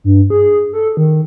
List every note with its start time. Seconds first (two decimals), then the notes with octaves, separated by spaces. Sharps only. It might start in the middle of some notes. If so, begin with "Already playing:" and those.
0.04 G2
0.30 G#4
0.73 A4
0.97 D#3